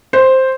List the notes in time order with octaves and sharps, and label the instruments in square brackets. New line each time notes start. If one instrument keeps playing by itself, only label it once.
[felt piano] C5